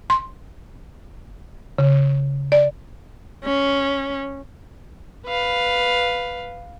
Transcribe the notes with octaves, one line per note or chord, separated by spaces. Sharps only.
C6
C#3
D5
C#4
B4 F5